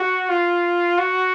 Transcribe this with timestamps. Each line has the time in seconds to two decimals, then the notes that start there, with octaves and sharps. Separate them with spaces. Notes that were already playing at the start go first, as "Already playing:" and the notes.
Already playing: F#4
0.29 F4
0.98 F#4